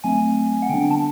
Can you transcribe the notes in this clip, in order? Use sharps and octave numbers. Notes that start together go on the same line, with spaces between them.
F#3 A3 C4 G#5
F#5
D3 G3 B3 D4 G5
G5
A5